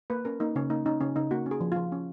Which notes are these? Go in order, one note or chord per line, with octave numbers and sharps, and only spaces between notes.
A#3 B4
C#4 A#4
A#3 D#4
C#3 C#4
A#3 D#4
C#4 D#4
C#3 C#4
C#3 D#4
A#3 F#4
C#4
G#4
F3
F3 F4
C#4